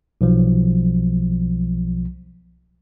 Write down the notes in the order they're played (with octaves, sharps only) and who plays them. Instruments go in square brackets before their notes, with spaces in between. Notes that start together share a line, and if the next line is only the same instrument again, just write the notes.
[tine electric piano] B1 F3